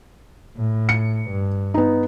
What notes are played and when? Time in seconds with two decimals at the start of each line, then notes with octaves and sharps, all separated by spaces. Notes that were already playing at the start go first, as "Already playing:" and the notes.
0.56 A2
0.89 C#7
1.30 G2
1.74 B3 D#4